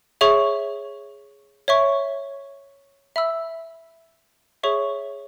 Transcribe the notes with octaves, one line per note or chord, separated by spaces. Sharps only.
G#4 C#5 E5 C#6
C#5 E5 C#6
E5 B5 E6
G#4 C#5 E5 C#6